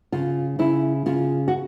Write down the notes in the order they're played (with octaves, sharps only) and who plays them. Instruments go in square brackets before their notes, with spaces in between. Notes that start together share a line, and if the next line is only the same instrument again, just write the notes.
[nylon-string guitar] C#3 F4
C#3 E4
C#3 F4
F#4